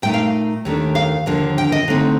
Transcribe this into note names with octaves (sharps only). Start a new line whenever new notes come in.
A#2 A3 D#4 G5
F5
D#2 D#3 A3 D4
F5
D#2 D3 F3 A#3 D4
G5
D#5
D3 A3 C4 D#4